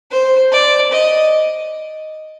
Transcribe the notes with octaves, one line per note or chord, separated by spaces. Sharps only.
C5
D5
D#5